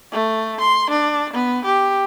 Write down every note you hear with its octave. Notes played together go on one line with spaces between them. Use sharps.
A3
C6
D4
B3
G4